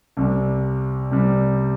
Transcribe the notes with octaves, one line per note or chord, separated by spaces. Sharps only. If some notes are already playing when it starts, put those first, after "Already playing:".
C2 C3 G3
C2 C3 G3